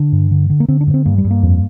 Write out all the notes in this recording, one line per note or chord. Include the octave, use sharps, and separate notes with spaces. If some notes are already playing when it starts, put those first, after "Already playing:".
Already playing: D3 D4
G2
D3
D3
A#3
D3 C4
D4
G2
C4
G2 A#3
G3
G2
A#3
F2